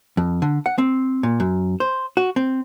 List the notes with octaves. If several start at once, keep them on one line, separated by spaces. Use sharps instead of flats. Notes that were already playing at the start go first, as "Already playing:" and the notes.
F2
D3
F#5
C4
A#2
F#2
C5
F#4
C4